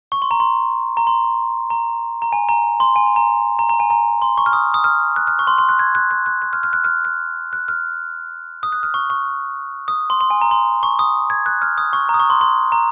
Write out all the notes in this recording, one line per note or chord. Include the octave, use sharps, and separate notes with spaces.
C#6
C6
A#5
C6
A#5
C6
A#5
A#5
G#5
A#5
C6
G#5
A#5
A#5
A#5
A#5
G#5
A#5
C6
C#6
F6
D#6
D#6
F6
F#6
F6
C#6
C6
C6
F#6
G#6
F#6
F#6
F#6
F#6
F6
F6
F#6
F6
F#6
F#6
F6
D#6
F#6
F6
C#6
C#6
D#6
C6
C6
G#5
A#5
C6
C#6
D#6
G#6
F#6
F6
D#6
C#6
A#5
D#6
C#6
C6
C6
A#5